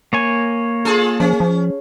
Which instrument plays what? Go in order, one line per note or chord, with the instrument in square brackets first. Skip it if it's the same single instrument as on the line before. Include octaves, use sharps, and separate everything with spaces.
[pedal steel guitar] A#3 C#5 G#5
[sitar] F4 G#4 A4
[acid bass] F3 [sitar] C#4
[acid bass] F3